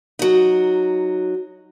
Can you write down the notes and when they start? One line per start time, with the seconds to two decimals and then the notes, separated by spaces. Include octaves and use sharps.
0.19 F#3 D#4